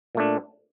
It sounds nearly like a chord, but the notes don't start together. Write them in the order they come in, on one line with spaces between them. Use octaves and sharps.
A#2 A3 D4